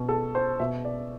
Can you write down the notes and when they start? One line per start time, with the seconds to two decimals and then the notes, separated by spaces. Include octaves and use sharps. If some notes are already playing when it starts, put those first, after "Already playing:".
Already playing: B2
0.09 A4
0.35 C5
0.60 B2 E5
0.85 D5